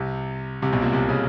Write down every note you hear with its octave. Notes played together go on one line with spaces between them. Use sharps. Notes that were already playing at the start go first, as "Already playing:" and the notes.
Already playing: C2 C3
C2 C3
B1 B2
A#2
C2 C3
C#3